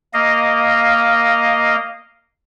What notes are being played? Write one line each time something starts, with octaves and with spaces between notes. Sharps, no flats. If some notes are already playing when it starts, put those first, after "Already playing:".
A#3 D#5 F5